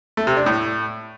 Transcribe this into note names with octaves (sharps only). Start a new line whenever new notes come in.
A3
C3
D4
A2